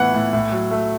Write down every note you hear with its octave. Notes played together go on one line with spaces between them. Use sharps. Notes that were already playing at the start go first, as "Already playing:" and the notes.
Already playing: A2 E3 B3 F#5
A2
A2
F#3
A3